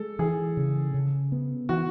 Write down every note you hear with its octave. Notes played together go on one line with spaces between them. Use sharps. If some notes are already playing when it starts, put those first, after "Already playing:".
Already playing: G#3 A4
E3 G#4
C#3
C#3
B3
E3 F#4